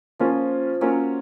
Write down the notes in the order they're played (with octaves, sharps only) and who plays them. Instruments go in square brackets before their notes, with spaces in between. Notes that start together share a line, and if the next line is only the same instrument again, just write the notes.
[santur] F3 [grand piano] A#3 C#4 F4
[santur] F#3 [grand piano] A#3 C#4 F4